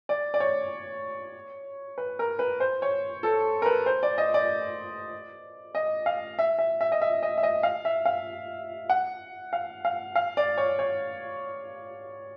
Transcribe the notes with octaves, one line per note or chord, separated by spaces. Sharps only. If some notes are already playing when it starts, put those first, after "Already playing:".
D5
D5
C#5
B4
A#4
B4
C5
C#5
A4
A#4
B4
C5
D5
D#5
D5
D#5
F5
E5
E5
E5
D#5
E5
D#5
E5
D#5
F5
E5
F5
F#5
F5
F5
F5
D5
C#5
C#5